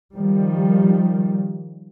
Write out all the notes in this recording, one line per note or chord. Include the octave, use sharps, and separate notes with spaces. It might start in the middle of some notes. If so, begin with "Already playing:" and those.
D#3 F3 G3